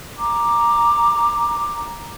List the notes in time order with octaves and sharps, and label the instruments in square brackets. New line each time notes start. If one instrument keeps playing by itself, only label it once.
[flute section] A#5 D6